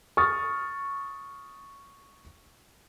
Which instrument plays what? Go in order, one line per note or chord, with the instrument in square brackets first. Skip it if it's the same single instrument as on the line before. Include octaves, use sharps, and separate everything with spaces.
[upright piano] C#6 D#6 F6 A6